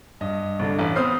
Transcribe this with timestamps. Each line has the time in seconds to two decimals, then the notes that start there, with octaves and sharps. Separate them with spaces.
0.21 G2 D#5
0.59 C2 D3
0.79 A1
0.96 B3 C4 C5 D#6 F6 C7